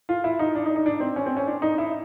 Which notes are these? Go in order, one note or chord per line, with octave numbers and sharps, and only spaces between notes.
F4
E4
D#4
D4
D#4
D#4
D4
C4
C#4
C4
C#4
D4
D#4
E4